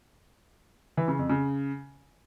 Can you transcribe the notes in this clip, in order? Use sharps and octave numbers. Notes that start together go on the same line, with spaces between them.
E3
C#3
F2
C#3